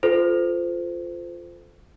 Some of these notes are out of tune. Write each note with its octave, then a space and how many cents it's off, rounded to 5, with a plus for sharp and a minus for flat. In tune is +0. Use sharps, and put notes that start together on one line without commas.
F4 +0 A4 +0 C5 -25